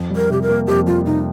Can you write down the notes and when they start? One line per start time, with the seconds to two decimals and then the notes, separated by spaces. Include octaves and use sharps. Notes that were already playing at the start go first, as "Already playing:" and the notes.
Already playing: F2
0.10 G3
0.16 A#4
0.29 C3 G4
0.42 A#4
0.49 A#3
0.67 F2 G4
0.87 G3 F4
1.06 C3 D#4